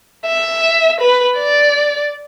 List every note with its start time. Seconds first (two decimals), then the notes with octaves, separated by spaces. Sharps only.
0.26 E5
1.00 B4
1.37 D5